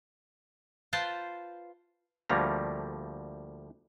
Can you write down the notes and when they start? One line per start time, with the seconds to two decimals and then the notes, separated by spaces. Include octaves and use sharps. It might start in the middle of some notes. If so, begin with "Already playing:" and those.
0.93 F4 B4 C5 G5 A5
2.29 D2 F3 G3 A3 A#3 A#5